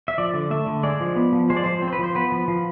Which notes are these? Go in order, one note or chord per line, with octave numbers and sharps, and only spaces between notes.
E5
F3 D5
D3
A3 E5
D3
G#3 D5
F3
B3
F3
G#3 C5
D5
F3 C5
C4
C5
B4
F3 C5
B3 B4
F3
F3